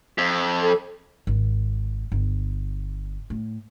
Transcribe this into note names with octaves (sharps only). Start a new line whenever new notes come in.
F2
A4
G#1
G1
A2